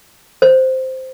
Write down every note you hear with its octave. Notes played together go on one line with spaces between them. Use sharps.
C5